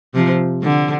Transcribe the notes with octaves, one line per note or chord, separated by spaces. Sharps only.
C3 F3
D3